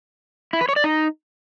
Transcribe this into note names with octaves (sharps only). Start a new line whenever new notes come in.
E4
B4
C#5
D5
D#4